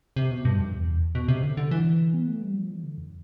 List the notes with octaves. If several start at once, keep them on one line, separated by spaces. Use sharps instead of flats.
C3
B2
G2
F2
E2
B2
C3
D3
D3
E3
B3
A3
G3
F3
E3
D3
F2